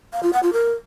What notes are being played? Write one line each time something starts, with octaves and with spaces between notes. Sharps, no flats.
F5
F4
F#5
F4
A#4